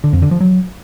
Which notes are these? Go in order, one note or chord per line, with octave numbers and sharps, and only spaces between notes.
D3
F2
D3
F3
F#3